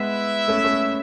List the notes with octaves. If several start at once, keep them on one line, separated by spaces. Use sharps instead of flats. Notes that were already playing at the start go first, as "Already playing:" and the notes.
Already playing: G#3 B3 E4 B4 E5
A3 C#4
A3 C#4